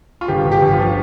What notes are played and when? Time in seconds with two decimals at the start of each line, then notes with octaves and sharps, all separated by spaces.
0.21 F4
0.28 G1 G4
0.46 G1
0.52 G4
0.62 G1
0.73 F4
0.79 F3